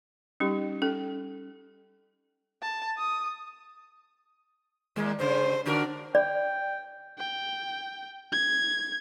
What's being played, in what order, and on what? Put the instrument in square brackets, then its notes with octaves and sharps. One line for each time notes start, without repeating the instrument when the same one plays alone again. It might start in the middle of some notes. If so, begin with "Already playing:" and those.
[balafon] G3 D#4 [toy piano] C#4 G4
[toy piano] C#4 [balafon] A4
[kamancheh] A5
D#6
[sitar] D#2 A#3 [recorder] G#3
[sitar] G2 C#3 [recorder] C5
[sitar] D3 F#4 A#4 [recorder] D4
[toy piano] D5 [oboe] G5
[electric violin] G5
G#6